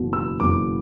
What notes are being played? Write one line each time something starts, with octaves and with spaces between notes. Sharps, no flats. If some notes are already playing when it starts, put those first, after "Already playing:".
Already playing: F#1 E2 B2 F#3
E6
F#1 E2 B2 F#3 D6